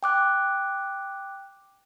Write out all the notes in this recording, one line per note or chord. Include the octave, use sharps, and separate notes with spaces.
G5 D6 F#6